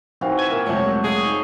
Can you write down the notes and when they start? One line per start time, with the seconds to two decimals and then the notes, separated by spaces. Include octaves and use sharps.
0.21 D#3 E3 C4 F#4 F5
0.39 E5 G#5 G#6
0.50 A#2 A#4
0.67 F2 C3 F#3 G#3 A3 C#5
1.04 G#4 A4 C#5 F5
1.24 D#4